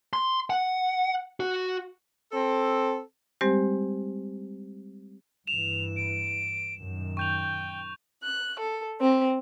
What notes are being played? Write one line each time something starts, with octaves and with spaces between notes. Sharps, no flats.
C6
F#5
F#4
C4 A4
G3 G#3 C4 G4 C5
G2 E3 E7 F7
D7
F#2 A#2 D#3
G5 C#6 G6 F7
F#6
A4
C4